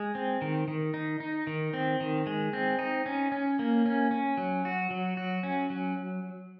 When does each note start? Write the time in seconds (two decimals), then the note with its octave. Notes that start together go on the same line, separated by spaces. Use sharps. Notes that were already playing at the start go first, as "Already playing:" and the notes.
Already playing: G#3
0.15 C4
0.42 D#3
0.68 D#3
0.94 D#4
1.20 D#4
1.47 D#3
1.74 C4
2.00 D#3
2.27 G#3
2.53 C4
2.79 D#4
3.06 C#4
3.32 C#4
3.59 A#3
3.86 C#4
4.11 C#4
4.37 F#3
4.65 F#4
4.91 F#3
5.17 F#4
5.43 C#4
5.70 F#3